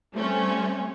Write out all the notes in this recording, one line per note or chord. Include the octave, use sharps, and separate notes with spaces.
G3 A3 C4 C#4